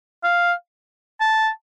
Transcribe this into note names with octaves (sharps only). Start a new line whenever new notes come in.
F5
A5